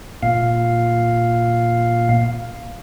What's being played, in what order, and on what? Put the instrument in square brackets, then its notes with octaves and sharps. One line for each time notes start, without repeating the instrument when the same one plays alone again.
[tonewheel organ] A#2 F5